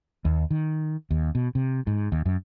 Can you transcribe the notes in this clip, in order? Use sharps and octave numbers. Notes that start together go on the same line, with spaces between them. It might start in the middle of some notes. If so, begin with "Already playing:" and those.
D#2
D#3
D#2
B2
C3
G#2
D#2
F#2